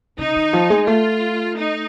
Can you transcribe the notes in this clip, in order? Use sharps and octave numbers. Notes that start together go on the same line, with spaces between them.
C#3 D#4
D#3
F3
G#3
A3 F4
D#4